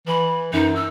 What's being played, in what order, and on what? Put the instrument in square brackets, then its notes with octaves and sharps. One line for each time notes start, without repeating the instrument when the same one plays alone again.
[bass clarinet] E3 [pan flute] B5
[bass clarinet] F#2 [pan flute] D#4
[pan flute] E6